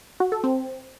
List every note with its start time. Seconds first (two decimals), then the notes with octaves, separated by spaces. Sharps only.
0.20 F#4
0.32 A4
0.44 C4